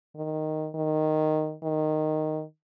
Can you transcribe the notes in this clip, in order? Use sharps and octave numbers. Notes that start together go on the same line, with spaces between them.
D#3
D#3
D#3